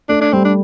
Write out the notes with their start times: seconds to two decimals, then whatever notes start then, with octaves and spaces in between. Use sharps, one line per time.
0.09 A3 D4
0.21 D4
0.33 G3 C4
0.45 D4